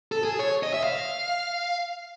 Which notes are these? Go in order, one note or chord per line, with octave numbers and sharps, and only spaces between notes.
A4
G#4
C#5
D#5
E5
F5